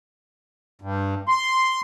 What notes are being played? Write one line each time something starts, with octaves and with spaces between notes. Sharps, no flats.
G2
C6